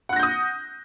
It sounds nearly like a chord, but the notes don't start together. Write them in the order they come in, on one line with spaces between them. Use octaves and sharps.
F#5 F#6 A#6 G6 D#6